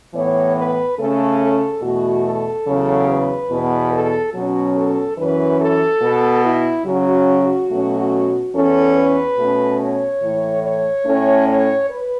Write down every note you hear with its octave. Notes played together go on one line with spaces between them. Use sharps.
A2 E3 B3 C#5
B4
C#3 A3 C#4 A4
A4
E2 B2 A3 F#4
A4
E2 C#3 F#3
B4
E2 B2 B3
A4
B2 F#3 C#4 F#4
A4
F#2 E3 C#4 B4
A4
B2 B3
E4
C#3 F#3 C#4 F#4
B2 F#3 A3 C#4
E2 E3 C#4 A4
B4
B2 A3 C#4
C#5
A2 E3 A3
C#5
A2 A3 C#4
C#5
B4